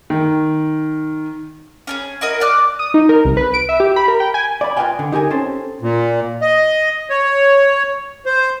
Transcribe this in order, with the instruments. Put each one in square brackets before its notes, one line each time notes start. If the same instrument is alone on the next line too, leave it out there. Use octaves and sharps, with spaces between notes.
[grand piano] D#3
[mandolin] C#4 D4 G#4
E4 F#4 A#4 D#5
D5 D6 F6 F#6
[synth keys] D#6
D#4
A#4
C2
B4
D7
E5
G4
B5
A#4
G5
G#5
[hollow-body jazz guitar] D5 B5
F4 B4 D#5 F5 G5 G#5
D3
D#4 G4 A#4 G#5
C4 C#4 A4 C5
[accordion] A#2
D#5
C#5
C5